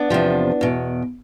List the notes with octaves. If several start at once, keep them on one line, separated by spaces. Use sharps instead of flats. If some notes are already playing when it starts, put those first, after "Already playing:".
Already playing: B3 D4
E2 C3 F3
E2 B2